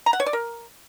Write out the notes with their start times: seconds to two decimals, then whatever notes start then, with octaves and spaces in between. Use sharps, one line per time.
0.06 A#5
0.13 F#5
0.20 C#5
0.26 D5
0.33 A#4